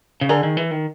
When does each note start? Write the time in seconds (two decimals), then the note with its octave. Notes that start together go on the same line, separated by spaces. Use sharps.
0.21 C#3
0.29 D3 G#4 A#4
0.43 D#3
0.57 E3
0.71 D#3